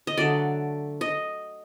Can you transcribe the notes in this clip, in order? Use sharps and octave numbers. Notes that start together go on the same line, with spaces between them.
D#5
D3 F#3 A3 D5
D#5